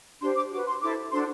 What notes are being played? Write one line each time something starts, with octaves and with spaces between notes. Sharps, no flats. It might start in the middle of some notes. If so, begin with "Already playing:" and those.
D4 G4 C5 C6
D6
F#4 B4 D6
C6
E4 A4 C5 D6
D4 F#4 A4 C5 C6